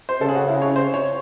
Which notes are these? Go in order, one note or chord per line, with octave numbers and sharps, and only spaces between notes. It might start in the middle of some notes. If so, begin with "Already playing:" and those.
C5
C#3 A4
G#4
F#4
E4
C#5
C5
C#5